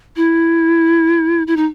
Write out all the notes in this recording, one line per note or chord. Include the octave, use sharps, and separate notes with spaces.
E4
E4
D#4